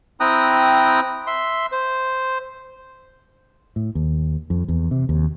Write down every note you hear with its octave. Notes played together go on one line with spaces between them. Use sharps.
C4 E4 G5 A#5 D#6 F#6
E5 C6
C5
A2
D#2
F2
E2
C3
D#2